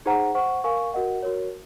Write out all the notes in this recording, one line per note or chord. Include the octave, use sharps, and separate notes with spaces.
D#4 G#4 C5 F#5 A#5
C5 F#5 C#6
A#4 F5 G#5 C#6
F#4 A#4 D#5 F#5
F#4 A#4 C#5